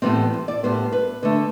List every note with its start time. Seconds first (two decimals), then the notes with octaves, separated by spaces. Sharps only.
0.02 A2 E3 G3 B3 C4
0.33 C5
0.48 D5
0.63 A2 G3 B3 C5
0.92 B4
1.23 D3 A3